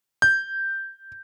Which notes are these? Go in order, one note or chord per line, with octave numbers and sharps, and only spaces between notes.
G6